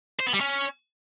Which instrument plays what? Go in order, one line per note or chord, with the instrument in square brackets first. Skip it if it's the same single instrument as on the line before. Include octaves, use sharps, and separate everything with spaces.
[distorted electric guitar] C5
B3
G3
C#4